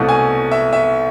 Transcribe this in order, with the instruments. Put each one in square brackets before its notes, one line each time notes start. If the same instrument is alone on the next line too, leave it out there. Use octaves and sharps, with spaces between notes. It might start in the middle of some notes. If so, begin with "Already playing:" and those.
Already playing: [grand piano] C2 B2 A3
G#5
E5
E5